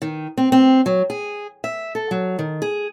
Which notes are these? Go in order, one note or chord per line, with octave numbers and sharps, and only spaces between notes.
D#3
C4
C4
F#3
G#4
E5
A4
F#3
D#3
G#4